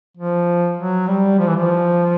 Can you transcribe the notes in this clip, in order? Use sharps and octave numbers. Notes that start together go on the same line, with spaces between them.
F3
F#3
G3
F3
E3
F3